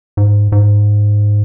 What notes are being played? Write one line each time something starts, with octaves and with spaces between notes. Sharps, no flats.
G#2
G#2